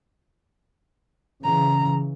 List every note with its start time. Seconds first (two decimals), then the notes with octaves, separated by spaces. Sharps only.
1.44 C#3 E3 A#5